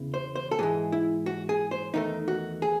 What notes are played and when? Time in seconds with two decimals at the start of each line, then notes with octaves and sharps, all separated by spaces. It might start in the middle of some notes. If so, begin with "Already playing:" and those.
Already playing: E2 C#3 E3
0.14 C5
0.36 C5
0.51 A4
0.59 G#2 E3 G#3 G#4
0.92 E4
1.26 F#4
1.49 G#4
1.71 C5
1.94 E2 D#3 A3 D#4
2.28 F#4
2.62 G#4